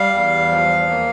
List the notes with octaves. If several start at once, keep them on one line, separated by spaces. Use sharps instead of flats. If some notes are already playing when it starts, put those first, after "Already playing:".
Already playing: G3 F5
E2
F3
A#3